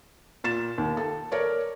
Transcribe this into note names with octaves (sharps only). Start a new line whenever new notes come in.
A#2 A6 E7
D#2
A4
A#4 C#5 D5